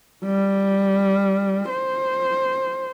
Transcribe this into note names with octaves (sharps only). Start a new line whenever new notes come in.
G3
C5